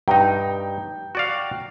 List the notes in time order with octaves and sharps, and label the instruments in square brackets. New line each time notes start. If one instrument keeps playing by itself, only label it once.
[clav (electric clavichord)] G2 D#4 [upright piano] G5 A#5
[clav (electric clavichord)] F#4 D5 F5